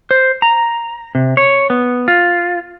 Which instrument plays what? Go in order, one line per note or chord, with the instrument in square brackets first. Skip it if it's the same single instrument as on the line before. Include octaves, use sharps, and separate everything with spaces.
[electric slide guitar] C5
A#5
C3
C#5
B3
F4